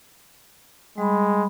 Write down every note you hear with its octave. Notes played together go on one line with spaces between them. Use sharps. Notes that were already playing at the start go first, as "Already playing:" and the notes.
G3 G#3 B5